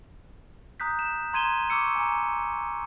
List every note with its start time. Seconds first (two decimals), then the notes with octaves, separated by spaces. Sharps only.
0.80 A#5 D#6 F#6 G6 B6
0.99 E7
1.33 A#5 C6 G#6 D#7 E7 G7
1.70 C#6 D6 E6 C#7
1.95 G#5 A#5